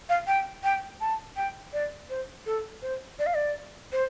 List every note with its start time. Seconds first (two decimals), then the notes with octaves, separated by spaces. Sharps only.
0.09 F5
0.27 G5
0.64 G5
1.01 A5
1.37 G5
1.73 D5
2.10 C5
2.46 A4
2.82 C5
3.19 D5
3.26 F5
3.35 D5
3.92 C5